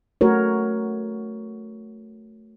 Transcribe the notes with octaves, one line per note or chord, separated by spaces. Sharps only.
A3 F#4 A#4 C#5